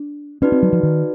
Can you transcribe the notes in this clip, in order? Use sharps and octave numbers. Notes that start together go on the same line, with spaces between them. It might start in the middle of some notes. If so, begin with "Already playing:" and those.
Already playing: D4
C#4 D#4 F#4 B4 D5
C4
F#3
F3
D#3